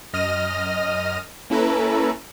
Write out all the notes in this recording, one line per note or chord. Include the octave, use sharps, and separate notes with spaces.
F#2 D#5 F6 A#6 D#7
A#3 C#4 E4 A4 B4 A#5